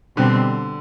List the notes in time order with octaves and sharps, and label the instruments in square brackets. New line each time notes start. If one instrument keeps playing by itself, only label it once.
[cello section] B2 G3 C4 [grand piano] D3